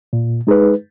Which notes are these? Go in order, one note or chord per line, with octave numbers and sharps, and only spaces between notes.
A#2
G#3 D#4 G#4 B4